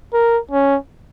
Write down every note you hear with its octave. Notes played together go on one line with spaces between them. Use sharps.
A#4
C#4